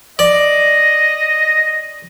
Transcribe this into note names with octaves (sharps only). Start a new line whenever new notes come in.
D5 D#5